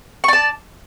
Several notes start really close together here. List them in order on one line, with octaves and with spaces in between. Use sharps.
C#6 D5 A5